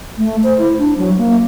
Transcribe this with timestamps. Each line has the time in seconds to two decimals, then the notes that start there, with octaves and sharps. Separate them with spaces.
0.18 A3
0.44 C5
0.58 E4
0.78 D4
0.98 F#3
1.18 A#3